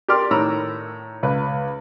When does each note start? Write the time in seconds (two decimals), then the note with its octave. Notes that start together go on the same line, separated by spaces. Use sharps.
0.08 G4 A#4 D5 C6 F6
0.31 A2 D#3 A#5 B5 E6
1.23 C#2 B4